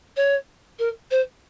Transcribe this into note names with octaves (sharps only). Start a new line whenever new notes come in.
C#5
A#4
C5